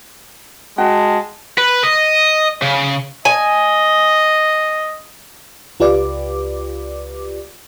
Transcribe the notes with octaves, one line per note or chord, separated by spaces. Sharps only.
G#3 F#4 G5 A5
B4
D#5
C#3
D#5 G#5
C#2 F4 G4 B4 D5 D6